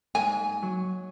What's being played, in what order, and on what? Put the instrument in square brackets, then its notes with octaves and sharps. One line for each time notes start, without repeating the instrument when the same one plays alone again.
[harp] G#2 G#3 [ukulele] G#5
[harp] F#3